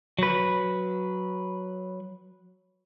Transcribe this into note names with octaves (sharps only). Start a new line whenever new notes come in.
F#3 B4